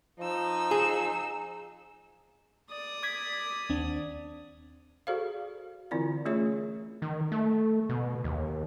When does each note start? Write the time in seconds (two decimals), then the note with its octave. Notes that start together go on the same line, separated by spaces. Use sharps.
0.20 F3 D#4 E6
0.71 G#4
2.71 D5 D#6
3.03 D6 G#6 B6
3.70 D#2 C4 D4
5.07 F#4 G#4 A4 C5 D5 F5
5.91 D3 E3 C4 E4 F4 D5
6.25 A3 C#4 F4 G#4 C#5 E5
7.02 D#3
7.32 A3
7.89 B2
8.24 D#2